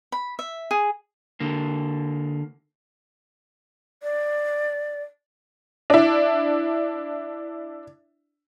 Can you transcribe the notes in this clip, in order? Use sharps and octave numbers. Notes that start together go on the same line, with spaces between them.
B5
E5
G#4
D3 A#3
D5
D4 E4